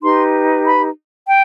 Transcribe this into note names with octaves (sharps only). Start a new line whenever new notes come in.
D#4 G4 B4 C6
B5
G5